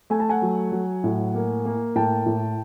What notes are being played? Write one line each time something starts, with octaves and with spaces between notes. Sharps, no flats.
A3 G#5
A5
F#5 G#5
F#3
F#3
A2
A#3
A#3
A2 G5 A5
A2